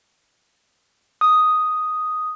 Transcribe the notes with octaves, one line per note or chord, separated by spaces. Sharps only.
D#6